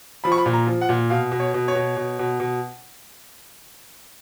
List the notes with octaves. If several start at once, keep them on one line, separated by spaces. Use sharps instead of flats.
F3 B5
C#6
B5
A#2
A#5
F3
F#5
A#2
B2 F5
B2
C#5
B2
C#5
B2
B2
B2
B2